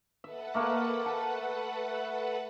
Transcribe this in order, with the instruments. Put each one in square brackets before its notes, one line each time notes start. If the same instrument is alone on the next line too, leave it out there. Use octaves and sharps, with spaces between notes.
[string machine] A4 B4 F#5 [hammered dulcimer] E5
[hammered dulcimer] A3 A#3 A#4
A5